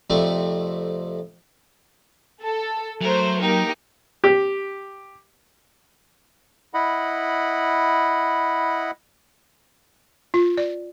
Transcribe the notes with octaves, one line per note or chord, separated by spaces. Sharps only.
F2 C3 A3 C4 D5 C#6
A4
F#3 A3 A#4 C5
A#3 D#4 G4 A#4
G4
E4 D#5 F#5 B5
F4
D5